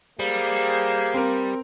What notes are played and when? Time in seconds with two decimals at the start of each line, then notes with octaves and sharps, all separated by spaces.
0.19 G3 A#3 G#4 C5
1.14 C4 A#4